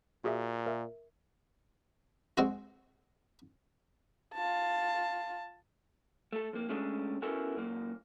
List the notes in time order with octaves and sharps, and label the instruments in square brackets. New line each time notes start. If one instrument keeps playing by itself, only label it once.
[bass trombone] A#2 [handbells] F#4 G#4 E5
[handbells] A#4 E5
[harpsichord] G#3 C4 F#4
[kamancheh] F4 A5
[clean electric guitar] A3 A4
F2 A#3
G#3 A3 C#4 D4 G#4 A4
B3 C#4 E4 F#4 A4 A#4
F#2 A#2 A#3